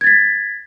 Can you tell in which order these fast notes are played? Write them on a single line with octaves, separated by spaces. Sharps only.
G#6 A6 B6